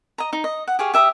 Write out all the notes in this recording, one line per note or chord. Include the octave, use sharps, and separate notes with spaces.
D#5 A#5
D#4
D#5
F#5
G4 G#4 C#5 F5
G4 E5 A#5 D#6